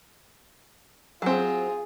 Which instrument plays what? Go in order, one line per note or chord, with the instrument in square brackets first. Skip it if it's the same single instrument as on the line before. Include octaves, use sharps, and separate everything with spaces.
[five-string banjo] F#3 C4 [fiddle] F4 G#4